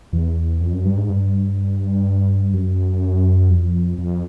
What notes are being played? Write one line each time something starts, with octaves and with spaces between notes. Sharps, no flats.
E2
F2
F#2
G2
G#2
G2
F#2
F2
F2